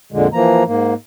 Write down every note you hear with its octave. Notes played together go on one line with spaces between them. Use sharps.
F2 A#2 D3 G#3
E3 F3 A#3 A#5
G#2 A#3